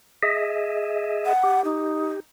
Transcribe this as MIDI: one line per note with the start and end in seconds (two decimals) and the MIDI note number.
0.23 1.33 68
0.23 1.33 75
0.23 1.33 76
1.25 1.63 78
1.43 2.20 67
1.64 2.10 63